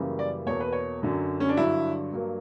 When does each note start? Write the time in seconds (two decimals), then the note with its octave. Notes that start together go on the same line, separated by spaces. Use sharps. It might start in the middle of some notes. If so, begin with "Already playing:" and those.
Already playing: F#2 C#3 E3 G3 A#3
0.19 D5
0.47 E2 B2 A#3 C#5
0.60 B4
0.72 C#5
1.02 F#2 D3 F#3
1.40 C#4
1.49 D4
1.57 G2 D3 F#3 E4
2.13 G2 F#3 A#3